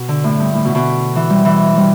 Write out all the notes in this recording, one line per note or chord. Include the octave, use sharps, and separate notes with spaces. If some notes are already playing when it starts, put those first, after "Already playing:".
Already playing: B2
D3
A2
G2
A2
B2
B2
E3
G3
E3
G3